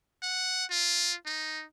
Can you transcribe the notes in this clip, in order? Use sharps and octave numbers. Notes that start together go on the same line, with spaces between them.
F#5
F4
D#4